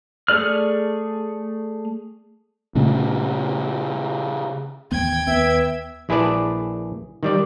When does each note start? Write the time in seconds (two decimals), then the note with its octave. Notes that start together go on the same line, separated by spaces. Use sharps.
0.28 A3 G#4 D5 F6
2.75 A#2 C#3 A3
4.92 A1 D#2 B3 G5 G#6
5.27 D#2 B3 E5
6.09 A#1 E4 G#4 B4 D5 A5
7.23 D#3 G3 D5